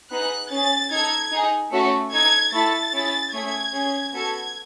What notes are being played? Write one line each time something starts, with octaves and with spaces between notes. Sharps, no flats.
B3 D#4 G#4 F#6
C#4 G#4 A6
D#4 A4 G#6
D#4 G#4
A3 C#4 F#4 A4
D#4 A4 G#6
A3 E4 A4 A6
C#4 E4 G#4
A3 C#4 G#4 G#6
C#4 G#4
B3 F#4 A4 G#6